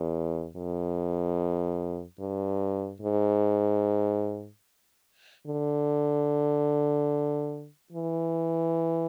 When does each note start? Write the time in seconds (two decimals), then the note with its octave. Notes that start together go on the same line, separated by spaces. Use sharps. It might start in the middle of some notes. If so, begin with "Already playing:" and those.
Already playing: E2
0.56 F2
2.19 G2
3.01 G#2
5.47 D3
7.92 E3